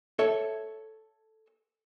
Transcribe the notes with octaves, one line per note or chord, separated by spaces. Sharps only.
A4 C#5 E5